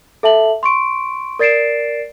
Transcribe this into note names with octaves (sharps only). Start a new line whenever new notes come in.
A4 E5 A5 F#7
C6 C#6 D7
A#4 D5 A6 C7 D7 E7